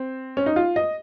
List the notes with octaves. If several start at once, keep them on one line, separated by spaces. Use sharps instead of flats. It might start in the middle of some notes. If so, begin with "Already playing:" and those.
Already playing: C4
C#4
D#4
F4
D#5